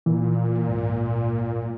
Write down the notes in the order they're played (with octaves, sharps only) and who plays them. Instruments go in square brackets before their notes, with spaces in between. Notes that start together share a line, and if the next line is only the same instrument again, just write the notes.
[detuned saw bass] A#2 [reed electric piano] E3
[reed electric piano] C#2 G#2